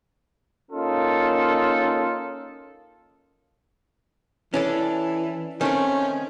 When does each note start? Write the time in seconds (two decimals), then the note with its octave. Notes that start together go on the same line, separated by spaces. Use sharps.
0.71 A#3 C#4 D#4 F4 A4
4.54 E3 C#4 D4 A4
5.61 D#3 A3 C4 C#4